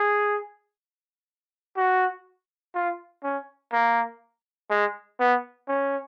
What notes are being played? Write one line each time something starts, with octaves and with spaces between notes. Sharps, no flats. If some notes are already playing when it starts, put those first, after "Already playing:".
Already playing: G#4
F#4
F4
C#4
A#3
G#3
B3
C#4